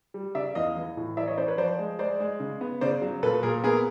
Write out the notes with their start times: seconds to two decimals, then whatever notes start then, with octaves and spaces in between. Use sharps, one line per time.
0.14 G3
0.35 C#3 D5 E5
0.55 E2 D#5 F5
0.76 E3
0.97 A2
1.17 E3 D5 E5
1.27 C#5 D#5
1.37 C#4 C5 D5
1.48 B4 C#5
1.58 F3 C5 D5
1.79 G#3
1.99 G#3 C5 D5
2.20 G#3
2.40 C#3
2.61 B3
2.81 C#3 C5 D5
3.02 F#3
3.23 A#2 A4 B4
3.43 A#2 G#4 A#4
3.64 B3 G#4 A#4